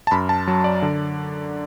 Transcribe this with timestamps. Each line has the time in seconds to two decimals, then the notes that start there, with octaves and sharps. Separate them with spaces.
0.07 A5
0.11 F#2 B5
0.29 A5
0.48 F#3
0.64 D5
0.82 D3